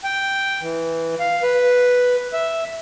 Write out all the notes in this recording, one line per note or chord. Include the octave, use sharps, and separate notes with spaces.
G5
E3
F5
B4
E5